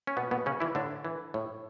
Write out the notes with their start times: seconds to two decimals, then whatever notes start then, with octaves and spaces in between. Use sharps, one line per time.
0.07 C#4
0.17 B2 B3
0.31 B2 B3
0.46 C#3 C#4
0.60 E3 E4
0.75 A2 D3 D4
1.05 E3
1.34 A2